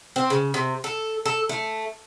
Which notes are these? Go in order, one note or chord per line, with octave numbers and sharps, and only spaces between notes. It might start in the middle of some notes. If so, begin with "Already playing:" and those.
C4
C#3
C3
A4
A4
A3